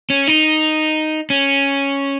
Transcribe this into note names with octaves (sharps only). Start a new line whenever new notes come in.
C#4
D#4
C#4